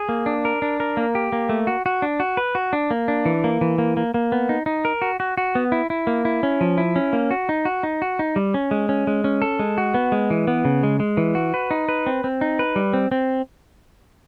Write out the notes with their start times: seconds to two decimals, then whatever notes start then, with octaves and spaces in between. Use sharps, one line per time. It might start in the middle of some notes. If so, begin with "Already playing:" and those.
Already playing: G#4
0.09 A#3
0.26 D4
0.45 A#4
0.62 D4
0.80 A#4
0.97 A#3
1.15 G4
1.32 A#3
1.49 A3
1.67 F#4
1.86 F#4
2.02 D4
2.20 F#4
2.37 B4
2.55 F#4
2.73 D4
2.91 A#3
3.08 D4
3.26 E3
3.44 A#3
3.61 E3
3.78 A#3
3.97 A#3
4.14 A#3
4.32 B3
4.49 D#4
4.66 D#4
4.85 A#4
5.02 F#4
5.20 F#4
5.38 F#4
5.55 B3
5.72 E4
5.90 E4
6.07 A#3
6.25 E4
6.43 C#4
6.61 F3
6.78 E4
6.96 C#4
7.13 A#3
7.31 F#4
7.49 D#4
7.65 F#4
7.83 D#4
8.02 F#4
8.19 D#4
8.36 G3
8.54 C#4
8.71 G#3
8.89 C#4
9.07 G#3
9.24 C#4
9.42 A4
9.59 G#3
9.78 F#4
9.94 B3
10.12 G#3
10.30 E3
10.47 B3
10.65 C#3
10.83 G#3
11.00 G#3
11.17 E3
11.35 F#4
11.54 B4
11.71 D#4
11.89 B4
12.07 C4
12.24 C4
12.41 D#4
12.59 B4
12.76 G3
12.93 C4
13.12 C4